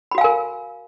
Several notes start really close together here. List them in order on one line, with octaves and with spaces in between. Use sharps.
B5 F#4 F5 G#5 A#4